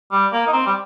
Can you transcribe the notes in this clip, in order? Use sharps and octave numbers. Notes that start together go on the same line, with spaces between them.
G3
A#3
D#4
C4
G3